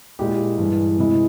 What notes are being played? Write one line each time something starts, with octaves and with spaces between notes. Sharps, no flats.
A#2 G#3 E4 G4
G2 E3 G#3
C3 E3 G#3 E4